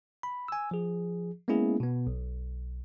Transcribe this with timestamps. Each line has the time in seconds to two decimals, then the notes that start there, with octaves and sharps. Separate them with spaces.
0.23 B5
0.48 G#5 E6
0.71 F3 G#4
1.48 G#3 A#3 B3 C#4 E4 G#4
1.80 B2 B3
2.07 B1